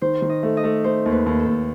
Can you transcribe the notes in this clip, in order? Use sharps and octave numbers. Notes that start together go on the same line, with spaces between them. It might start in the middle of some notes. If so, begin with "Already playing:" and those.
D#3 C5
D#3
D#5
A3
D#5
A3
A3 C5
D#2
B4
D#2
A4
D#2